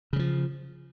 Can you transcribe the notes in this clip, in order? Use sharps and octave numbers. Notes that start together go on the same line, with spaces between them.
C#3 F3 F#3